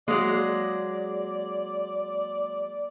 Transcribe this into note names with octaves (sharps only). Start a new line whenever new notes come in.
F#3 G#3 A#3 G#4 D5